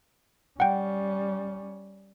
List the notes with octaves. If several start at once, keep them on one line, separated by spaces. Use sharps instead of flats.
G3 C#4 F#5 G5